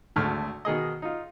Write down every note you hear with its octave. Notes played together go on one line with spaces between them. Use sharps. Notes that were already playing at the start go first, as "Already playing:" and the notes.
G#1 D2 A3 F6
B2 D#3 G#4 D#5
D#4 F4